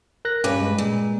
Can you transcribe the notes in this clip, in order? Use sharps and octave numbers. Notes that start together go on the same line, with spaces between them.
A#4 F#6 A#6
G2 C#4 B4 D6
G#3
A#2